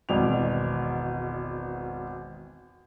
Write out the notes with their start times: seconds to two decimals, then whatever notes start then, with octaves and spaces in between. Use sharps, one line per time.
0.09 G#1 E2 B2 D5 F7